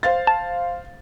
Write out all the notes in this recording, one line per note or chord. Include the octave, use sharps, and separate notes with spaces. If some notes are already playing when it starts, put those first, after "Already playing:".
C5 F5 A6
A5